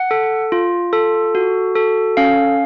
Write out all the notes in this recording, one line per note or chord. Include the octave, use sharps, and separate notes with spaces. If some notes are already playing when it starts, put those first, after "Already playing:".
Already playing: F#5
A4
F4
A4
F#4
A4
C#4 F5